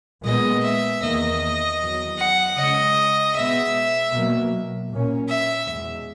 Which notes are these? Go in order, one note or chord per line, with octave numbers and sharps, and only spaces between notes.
A#2 G#3 B3 D#5
E5
E2 D#3 A#3 D#5
E2 D#3 F#3
F#5
C#3 G#3 C#4 D#5
B2 G#3 B3 E5
B2 F#3 A#3
A#2 A#3 C#4
E5
E2 B2 G#3